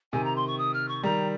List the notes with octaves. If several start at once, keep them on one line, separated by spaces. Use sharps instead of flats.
C3 D#3 G#5
A#5
C6
C#6
D#6
F6
C#6
D#3 G3 A#5